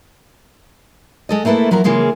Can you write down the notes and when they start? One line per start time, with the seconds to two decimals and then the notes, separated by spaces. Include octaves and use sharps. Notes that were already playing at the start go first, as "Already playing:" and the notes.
1.29 G#3 A4 D#5
1.45 A3 A#3 E4 A4 B4
1.71 F3 F#3 E4 A#4 A#5
1.84 C#3 E3 G#3 A#3 F4 G#4